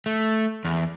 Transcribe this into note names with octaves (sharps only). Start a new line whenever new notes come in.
A3
E2